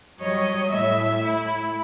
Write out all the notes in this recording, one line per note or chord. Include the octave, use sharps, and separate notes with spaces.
F#3 G3 C#5 D#5
A2 E5
E4